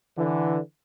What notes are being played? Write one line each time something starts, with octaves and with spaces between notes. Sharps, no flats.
D3 E3